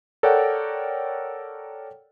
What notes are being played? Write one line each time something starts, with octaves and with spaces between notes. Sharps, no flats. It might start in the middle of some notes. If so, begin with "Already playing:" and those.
A4 A#4 C#5 D5 F#5 G5